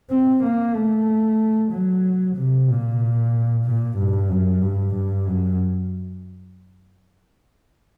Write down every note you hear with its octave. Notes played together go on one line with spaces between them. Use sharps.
C4
A#3
A3
F#3
C3
A#2
A#2
G2
F#2
G2
G2
F#2